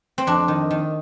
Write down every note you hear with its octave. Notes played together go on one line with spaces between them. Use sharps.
C4
F2 D4
D#3
D#3